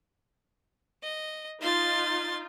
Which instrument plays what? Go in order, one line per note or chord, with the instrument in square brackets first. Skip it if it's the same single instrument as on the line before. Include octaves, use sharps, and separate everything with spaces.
[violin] D#5
[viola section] D#4 F4 [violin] C6 A6